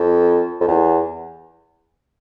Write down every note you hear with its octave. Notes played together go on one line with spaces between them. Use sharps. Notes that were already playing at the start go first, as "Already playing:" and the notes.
Already playing: F2
F2
E2